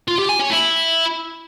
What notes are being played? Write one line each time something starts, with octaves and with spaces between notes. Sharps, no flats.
F4
G4
G#5
C#5
E4